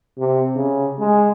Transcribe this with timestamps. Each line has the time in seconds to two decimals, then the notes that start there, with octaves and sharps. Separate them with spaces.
0.18 C3
0.56 C#3
0.99 G#3